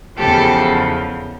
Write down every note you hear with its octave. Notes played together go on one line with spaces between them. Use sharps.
E2 C#3 F3 G4 A4